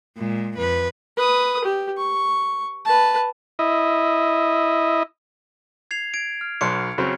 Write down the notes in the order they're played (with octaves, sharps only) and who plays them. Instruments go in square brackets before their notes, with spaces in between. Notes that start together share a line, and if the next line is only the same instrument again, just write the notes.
[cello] A#2 G#3
F2 B4
[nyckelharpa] B4 D#6
G4
C#6
B4 A5
[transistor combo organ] E4 D#5
[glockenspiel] G#6 C7 F7
G#6 D7
F6
[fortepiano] B1 F#3 C6 [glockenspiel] C#7
[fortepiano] C#3 F#3 C4